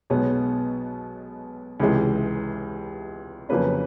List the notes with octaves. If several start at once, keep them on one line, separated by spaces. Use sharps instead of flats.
B1 B2 G#3 B3 C#5
C#2 C3 E3 G#3 C#4
F2 C#3 F#3 A#3 C#4 B4